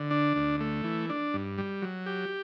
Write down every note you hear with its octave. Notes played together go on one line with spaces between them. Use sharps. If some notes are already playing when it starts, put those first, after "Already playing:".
Already playing: D3
D4
D2
A3
E3
D4
G2
G3
F#3
G4